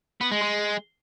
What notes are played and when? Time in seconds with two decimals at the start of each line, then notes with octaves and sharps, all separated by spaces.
0.21 B3
0.32 G#3
0.42 G#3